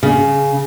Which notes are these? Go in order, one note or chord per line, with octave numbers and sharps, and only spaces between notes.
C#3